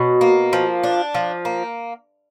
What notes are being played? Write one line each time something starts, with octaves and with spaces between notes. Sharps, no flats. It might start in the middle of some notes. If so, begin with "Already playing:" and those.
Already playing: B2 F#3
A#3
F3
D4
F3
A#3